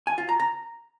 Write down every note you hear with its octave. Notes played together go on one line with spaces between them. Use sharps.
G#5
F4
A#5
A#5